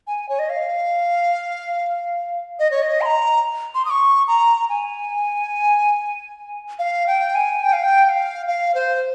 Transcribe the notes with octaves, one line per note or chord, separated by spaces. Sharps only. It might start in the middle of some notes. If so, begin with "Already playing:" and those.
G#5
C#5
D#5
F5
D#5
C#5
D#5
C6
A#5
C6
D#6
C#6
A#5
G#5
F5
G5
G#5
G5
F5
G5
G5
F5
F5
C5